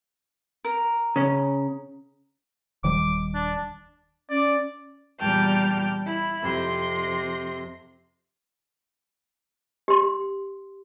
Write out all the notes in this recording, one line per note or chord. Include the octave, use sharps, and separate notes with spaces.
A#4
C#3 C#4
D#1 D#3 G3 D6
D4
C#4 D5
E2 A#2 G3 G5 A5 F6
E4
F2 C3 C6 A#6
G4 C6